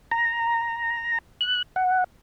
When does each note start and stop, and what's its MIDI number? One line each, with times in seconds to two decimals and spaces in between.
0.11 1.18 82
1.41 1.62 90
1.76 2.04 78